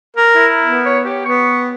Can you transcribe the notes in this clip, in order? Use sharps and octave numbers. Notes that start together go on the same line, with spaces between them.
A#4
E4
B3
C#5
G4
B3 C#6